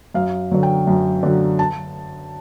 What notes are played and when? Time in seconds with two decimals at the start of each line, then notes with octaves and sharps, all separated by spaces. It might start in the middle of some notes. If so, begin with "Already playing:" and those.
0.14 F#2 F5
0.51 D3 F#3
0.63 G5
0.87 F#2
1.23 D3 F#3
1.59 A5